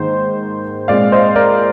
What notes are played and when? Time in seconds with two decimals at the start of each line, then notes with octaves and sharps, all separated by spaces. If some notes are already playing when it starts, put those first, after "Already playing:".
Already playing: G#2 D#3 A#3 C5
0.88 A#2 G#3 C4 D5 F5
1.12 C5 D#5
1.36 A#4 D5